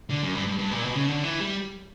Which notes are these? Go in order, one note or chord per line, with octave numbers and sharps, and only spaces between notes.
D3
F#2
G2
G2
G2
A#2
B2
C#3
D3
E3
G3